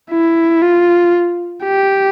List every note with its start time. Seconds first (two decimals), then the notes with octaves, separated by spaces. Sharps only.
0.11 E4
0.62 F4
1.64 G4